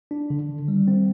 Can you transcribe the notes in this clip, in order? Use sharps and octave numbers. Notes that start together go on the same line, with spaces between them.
D4
D3
D#3
G3
C4